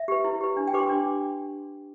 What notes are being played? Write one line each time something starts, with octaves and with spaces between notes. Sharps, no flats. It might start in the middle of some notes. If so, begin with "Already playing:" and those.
Already playing: E5
G4 B4
E4
G4 B4
D4
G5
G4 B4 D6
C6
D4